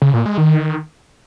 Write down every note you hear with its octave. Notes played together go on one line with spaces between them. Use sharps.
C#3
A#2
G#3
D#3